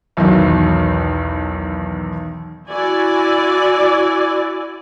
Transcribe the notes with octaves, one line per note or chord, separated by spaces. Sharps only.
B1 E2 D#3 F#3
E4 F#4 D5 G#5